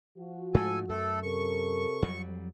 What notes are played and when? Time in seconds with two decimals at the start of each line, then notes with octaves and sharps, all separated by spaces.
0.17 F3 F#4
0.54 G#2 G#3 A3 A4 G#5
0.89 F#2 A3 A4
1.23 C3 A4 A#4 C#6
2.02 F2 F#3 G3